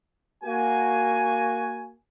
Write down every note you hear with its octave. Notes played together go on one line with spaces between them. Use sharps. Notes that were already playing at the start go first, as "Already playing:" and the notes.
A#3 F#4 G#5